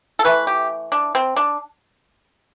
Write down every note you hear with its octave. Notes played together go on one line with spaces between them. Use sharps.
A4
E3 A3 B4
G4
D4
C4
D4